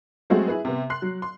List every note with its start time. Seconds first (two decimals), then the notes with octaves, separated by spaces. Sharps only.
0.30 F#3 G#3 A3 C4 F#4 G#4
0.48 E4 G#4 B4
0.65 C3 B3
0.90 C6 F#6 C7
1.02 F#3
1.22 C6